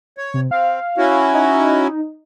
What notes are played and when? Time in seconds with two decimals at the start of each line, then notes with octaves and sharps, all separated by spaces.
0.17 C#5
0.34 C3
0.51 C4 F5
0.97 C#4 E4 F#4
1.34 D#4